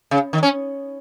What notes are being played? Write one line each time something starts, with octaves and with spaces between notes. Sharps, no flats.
C#3
D#3
C#4